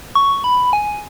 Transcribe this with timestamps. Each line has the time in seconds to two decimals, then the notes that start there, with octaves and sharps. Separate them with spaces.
0.15 C#6
0.44 B5
0.73 G#5